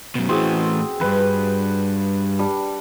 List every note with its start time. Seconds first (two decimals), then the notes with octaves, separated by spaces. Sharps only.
0.15 F#2 B2
0.29 A2 E3 C4 F#4 G#4
1.01 E2 G2 B4
2.39 G3 D4